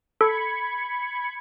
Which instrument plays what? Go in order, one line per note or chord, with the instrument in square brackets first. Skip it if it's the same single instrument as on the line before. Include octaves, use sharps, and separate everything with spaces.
[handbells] A4 [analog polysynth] B5 G#6 C#7